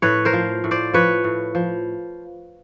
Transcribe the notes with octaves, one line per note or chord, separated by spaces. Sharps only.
A2 B4 C#5
A#4 C5
F3
A2
C5 D5
F3 B4 C#5
A2
F3